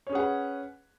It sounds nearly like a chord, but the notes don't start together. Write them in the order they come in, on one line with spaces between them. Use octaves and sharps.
C#5 C#4 G#4 F#5 B4